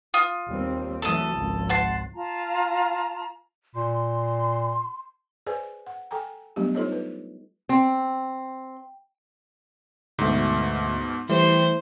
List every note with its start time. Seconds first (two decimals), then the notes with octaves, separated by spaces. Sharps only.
0.14 F4 D#6
0.48 D#2 G3 C4
1.02 E3 F#3 A3 A4 D#6
1.35 G#1 C#2 F3
1.69 F#5 A5 C6
2.15 F4 A5 A#5
3.75 A#2 C6
5.47 G#4 B4 C5 D5 G#5
5.87 F#5
6.11 A4 G5 G#5 A#5
6.56 F#3 G3 A3 B3 D4 G4
6.75 D#4 F4 A4 C5 C#5 D#5
6.92 B4
7.69 C4
10.19 D2 G#2 B2 A3
11.30 E3 G3 A3 C5